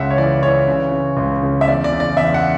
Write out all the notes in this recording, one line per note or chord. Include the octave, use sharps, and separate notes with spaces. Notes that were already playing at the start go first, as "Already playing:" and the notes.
Already playing: C#2 C#3 E5 F#5
C#5
E3 D5
E3 C#5
C#3
C#3
C#2
C#3
E5
E2 D5
D5
C#3
D5
E2 E5
F#5